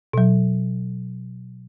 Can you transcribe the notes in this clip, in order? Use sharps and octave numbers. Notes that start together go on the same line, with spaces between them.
B2 F#3